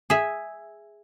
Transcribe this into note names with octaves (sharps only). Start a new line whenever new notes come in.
G#4 E5